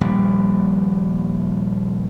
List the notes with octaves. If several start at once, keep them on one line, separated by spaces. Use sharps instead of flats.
D#1 A#1 G3